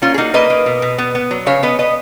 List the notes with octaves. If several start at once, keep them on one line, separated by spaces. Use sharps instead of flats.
A#3 C#4 F4
G#4
A#3 D#4 F#4
A#3 B4 D#5
A#3
B2
B2
B3
B3
F#3
C#3 C#5 F5
B3 B4 D#5
B3 B4 D#5